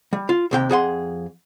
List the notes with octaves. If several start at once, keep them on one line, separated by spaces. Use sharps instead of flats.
G3
F4
D#2 C3 G5
F2 G#4 F#5 C6